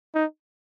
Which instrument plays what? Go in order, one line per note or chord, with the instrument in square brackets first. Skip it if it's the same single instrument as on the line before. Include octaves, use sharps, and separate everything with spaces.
[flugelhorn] D#4